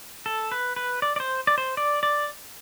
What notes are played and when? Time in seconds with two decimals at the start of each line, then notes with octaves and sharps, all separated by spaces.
0.26 A4
0.52 B4
0.76 B4
1.02 D5
1.16 D5
1.20 C5
1.47 D5
1.58 C5
1.77 D5
2.03 D5